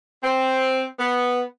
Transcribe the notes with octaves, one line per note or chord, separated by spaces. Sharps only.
C4
B3